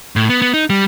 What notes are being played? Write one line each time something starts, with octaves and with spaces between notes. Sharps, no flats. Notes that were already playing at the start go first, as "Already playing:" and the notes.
A2
B3
B3
D#4
G3